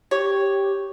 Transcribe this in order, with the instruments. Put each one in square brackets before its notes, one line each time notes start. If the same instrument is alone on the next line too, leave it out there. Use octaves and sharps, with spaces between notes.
[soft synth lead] G4 [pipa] C#5